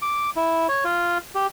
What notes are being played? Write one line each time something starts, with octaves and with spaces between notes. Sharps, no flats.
D6
E4
C#5
F4
G4